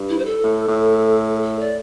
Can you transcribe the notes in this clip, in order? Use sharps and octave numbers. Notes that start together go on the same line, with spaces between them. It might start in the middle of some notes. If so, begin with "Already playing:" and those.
Already playing: G2
E4
C5
A4
A2
A2
A4
D5